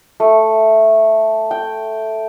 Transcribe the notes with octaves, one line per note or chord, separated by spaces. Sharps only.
A3
G5